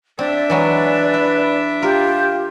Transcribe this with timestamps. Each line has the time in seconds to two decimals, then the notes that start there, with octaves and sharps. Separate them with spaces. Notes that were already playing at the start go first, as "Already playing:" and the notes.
0.19 C4 D4 D5 E5
0.50 E3 F#3 G#3 B4
1.14 E4
1.82 F4 G4 A#4